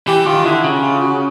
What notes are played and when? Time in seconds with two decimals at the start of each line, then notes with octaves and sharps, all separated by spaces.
0.07 E3 G4
0.27 D#3 F4
0.45 D3 E4
0.64 C#3
0.83 F4
1.01 F#4